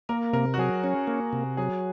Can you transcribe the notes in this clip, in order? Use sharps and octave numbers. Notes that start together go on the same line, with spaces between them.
A#3 A#4
C3 A#4
F#4
F#3 G#4
C#4
A#3
C3
F#3 G#4